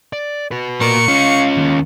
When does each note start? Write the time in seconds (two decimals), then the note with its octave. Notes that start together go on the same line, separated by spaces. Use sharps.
0.13 D5
0.51 F#4 B4
0.81 A#2 A#4 C#6
1.08 C#4 F4 F5
1.57 D#2